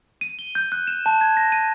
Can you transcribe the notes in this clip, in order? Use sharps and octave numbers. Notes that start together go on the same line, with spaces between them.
D#7
G7
G6
F#6
E7
A5
G#6
A#6
D#7